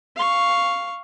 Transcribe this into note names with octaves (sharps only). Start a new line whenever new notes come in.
F5 C#6